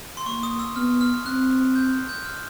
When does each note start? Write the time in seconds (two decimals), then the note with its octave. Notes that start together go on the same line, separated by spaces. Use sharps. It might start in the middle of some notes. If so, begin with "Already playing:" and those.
0.17 C6
0.26 A#3 C#6
0.43 D#6
0.59 E6
0.76 B3 F6
1.01 F6
1.26 C4 F#6
1.75 G6
2.09 G6
2.25 F6